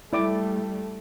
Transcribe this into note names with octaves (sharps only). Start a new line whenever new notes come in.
G3 A3 E4 D5 D6